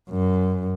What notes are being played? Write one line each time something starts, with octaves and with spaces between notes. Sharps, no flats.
F#2